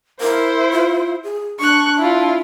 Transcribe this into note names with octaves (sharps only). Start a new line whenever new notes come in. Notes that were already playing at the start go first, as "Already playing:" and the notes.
E4 A#4 C5
F4
G#4
D4 C#6 F#6
E4 F4